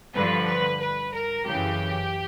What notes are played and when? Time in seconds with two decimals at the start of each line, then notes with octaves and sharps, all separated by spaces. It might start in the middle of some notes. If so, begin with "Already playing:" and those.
0.15 G2 D3 F3 B4
0.48 B4
0.81 B4
1.14 A#4
1.46 F#2 C#3 E3 G4